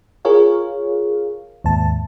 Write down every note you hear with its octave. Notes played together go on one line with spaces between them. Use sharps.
F4 G#4 A#4 C#5 F5
D#2 G#2 A5